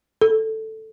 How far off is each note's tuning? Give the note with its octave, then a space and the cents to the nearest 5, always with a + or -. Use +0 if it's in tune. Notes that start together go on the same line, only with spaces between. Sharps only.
A4 +5